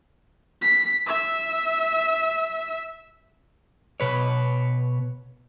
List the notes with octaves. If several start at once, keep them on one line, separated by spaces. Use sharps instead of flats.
B6
E5
B2 B4 C#5